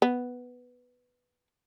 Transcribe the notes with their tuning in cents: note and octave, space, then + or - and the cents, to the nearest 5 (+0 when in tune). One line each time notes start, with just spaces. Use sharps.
B3 +0